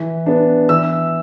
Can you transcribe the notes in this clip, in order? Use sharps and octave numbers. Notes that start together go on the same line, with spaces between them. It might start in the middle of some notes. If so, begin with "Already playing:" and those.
Already playing: E3
B3 D4
E3 E6